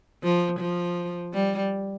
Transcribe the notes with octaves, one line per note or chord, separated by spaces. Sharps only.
F3
F3
G3